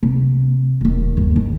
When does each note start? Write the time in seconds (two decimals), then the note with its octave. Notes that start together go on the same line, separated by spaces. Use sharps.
0.03 C3
0.81 E1 D#3
1.17 G1 D#2
1.36 D#3